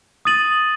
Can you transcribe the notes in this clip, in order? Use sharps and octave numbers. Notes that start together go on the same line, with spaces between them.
D#6 A6 D#7 F#7